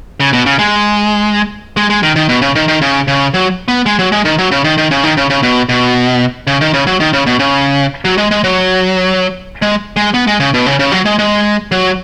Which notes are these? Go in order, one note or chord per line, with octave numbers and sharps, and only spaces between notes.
C#3
B2
C#3
G#3
G#3
G#3
D#3
D#3
B2
C#3
D#3
D#3
C#3
C#3
F#3
B3
G#3
F#3
G#3
D#3
F#3
C#3
D#3
D#3
C#3
D#3
C#3
C#3
B2
B2
C#3
D#3
C#3
F#3
D#3
C#3
B2
C#3
F#3
G#3
G#3
F#3
G#3
G#3
B3
G#3
C#3
B2
C#3
C#3
F#3
G#3
G#3
F#3